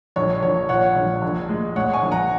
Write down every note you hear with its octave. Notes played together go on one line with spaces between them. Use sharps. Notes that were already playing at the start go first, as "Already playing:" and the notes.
A#1 C#5
A#1 C#5
A#2 C#5 F#5
A#1
A#1
G#3
G#3 C#5 F#5
G#5 C#6
A#1
F#5 A#5